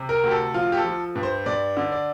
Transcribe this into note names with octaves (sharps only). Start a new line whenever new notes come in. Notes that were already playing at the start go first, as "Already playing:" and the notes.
Already playing: C3
A#4
D2 G4
A4
F3 F4
G4
A4
F3
G2
C5
G2 D5
D3
D5